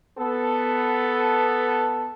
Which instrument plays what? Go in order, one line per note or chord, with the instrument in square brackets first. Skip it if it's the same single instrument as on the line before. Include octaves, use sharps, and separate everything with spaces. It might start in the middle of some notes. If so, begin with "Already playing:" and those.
[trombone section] B3 A4